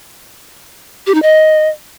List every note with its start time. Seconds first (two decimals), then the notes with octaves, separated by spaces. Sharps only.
1.07 G4
1.15 D#4
1.22 D#5